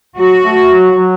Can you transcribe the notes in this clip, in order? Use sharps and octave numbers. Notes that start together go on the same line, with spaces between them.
F#3 F#4
A3
F#3
F#3